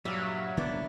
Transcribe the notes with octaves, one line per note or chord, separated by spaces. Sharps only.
G2 A#2 F#3 G3 E5 F5
D3 D#3 G3 A#3 B3 D4